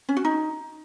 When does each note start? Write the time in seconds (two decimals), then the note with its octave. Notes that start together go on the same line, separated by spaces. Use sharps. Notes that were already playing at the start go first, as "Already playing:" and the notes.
0.09 C#4
0.17 F#4
0.25 D#4